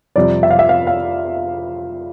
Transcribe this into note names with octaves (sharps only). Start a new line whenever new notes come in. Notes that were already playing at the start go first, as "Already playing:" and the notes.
F2 C3 G3 D5
E5
F5
E5
F5
F5